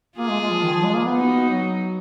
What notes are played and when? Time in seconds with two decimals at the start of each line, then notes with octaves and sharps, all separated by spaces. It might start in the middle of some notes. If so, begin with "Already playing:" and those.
0.18 A#3 F4 G#4
0.29 G#3
0.41 G#3
0.51 F3
0.62 D#3
0.73 F3
0.84 G#3
0.95 A#3
1.06 B3
1.17 D#4 F#4
1.49 F#3